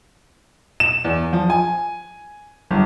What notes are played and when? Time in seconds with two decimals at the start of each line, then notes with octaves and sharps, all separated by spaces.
0.80 E7
1.05 E2
1.33 F3
1.50 G#5
2.71 G1